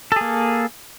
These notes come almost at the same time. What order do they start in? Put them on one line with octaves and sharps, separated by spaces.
A4 G#4 A#3